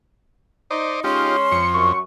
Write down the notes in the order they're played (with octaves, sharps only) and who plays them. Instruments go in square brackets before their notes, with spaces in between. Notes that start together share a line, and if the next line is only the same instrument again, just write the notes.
[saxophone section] D#4 [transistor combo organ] C5 D5 D#5
[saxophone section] G#3 C#4 [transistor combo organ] D#4 F4 G4 [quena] C6
[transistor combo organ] F2 [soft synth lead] C#7
[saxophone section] F#2 [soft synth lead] C#6